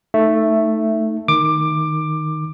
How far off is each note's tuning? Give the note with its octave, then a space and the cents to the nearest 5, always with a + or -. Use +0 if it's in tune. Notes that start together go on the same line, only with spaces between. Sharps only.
A3 +5 D#4 +0 E5 +0
D#3 -5 D6 +15